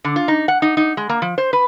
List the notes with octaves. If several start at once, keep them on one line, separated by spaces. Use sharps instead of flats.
D3
F4
D#4
F#5
D#4
D#4
G#3
A#3
F3
C5
B4